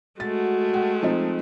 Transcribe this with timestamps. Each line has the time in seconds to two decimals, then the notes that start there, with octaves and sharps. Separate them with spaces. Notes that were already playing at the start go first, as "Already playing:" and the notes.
0.20 G#3 A3 F#4 A6
0.74 F#5 G5
1.03 F3 C4 D#4